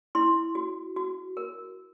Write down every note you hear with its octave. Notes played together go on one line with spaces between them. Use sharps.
E4 C6
F#4
F#4
A#4